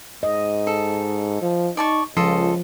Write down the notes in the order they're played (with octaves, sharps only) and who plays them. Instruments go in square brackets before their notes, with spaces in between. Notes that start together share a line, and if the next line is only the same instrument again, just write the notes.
[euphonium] G#2 [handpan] D#5
[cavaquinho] A4
[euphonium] F3
[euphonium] D#4 [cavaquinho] D5 A5 C#6
[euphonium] C#2 [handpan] F3 [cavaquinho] F4 A4 D#5